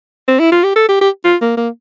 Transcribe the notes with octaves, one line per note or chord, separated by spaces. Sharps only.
C4
E4
F4
G4
A4
G4
G4
F4
A#3
A#3